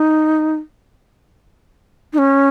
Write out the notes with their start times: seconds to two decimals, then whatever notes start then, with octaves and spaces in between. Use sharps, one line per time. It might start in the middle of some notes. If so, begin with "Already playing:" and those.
Already playing: D#4
2.13 D#4
2.18 C#4